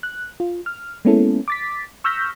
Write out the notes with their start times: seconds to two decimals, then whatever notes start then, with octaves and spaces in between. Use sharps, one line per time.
0.03 F#6
0.40 F4
0.66 F6
1.05 G#3 A#3 B3 C#4 E4 A4
1.48 D6 A6 B6
2.04 C#6 E6 F6 G6 A#6 B6